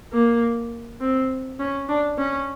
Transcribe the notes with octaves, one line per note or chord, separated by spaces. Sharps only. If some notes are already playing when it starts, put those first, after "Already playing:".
A#3
C4
C#4
D4
C#4